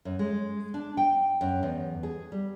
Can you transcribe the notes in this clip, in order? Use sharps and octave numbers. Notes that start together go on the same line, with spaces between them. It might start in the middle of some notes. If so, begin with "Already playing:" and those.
F#2
G#3
D4
G5
F#2
E2
G#4
G3